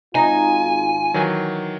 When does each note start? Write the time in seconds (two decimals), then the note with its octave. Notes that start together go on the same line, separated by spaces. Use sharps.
0.15 G#1 D#4 F4 G#5
1.14 D#3 E3 F#3